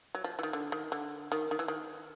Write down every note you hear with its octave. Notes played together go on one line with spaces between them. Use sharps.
F#3
F3
E3
D#3
D3
D#3
D3
D#3
D#3
E3
D#3